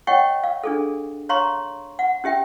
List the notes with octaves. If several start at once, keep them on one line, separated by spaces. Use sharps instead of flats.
C#5 D#5 F#5 G5 C#6
F5
D4 G#4 A4
C#5 F5 A#5 C6 C#6
F#5
C#4 G4 E5 G5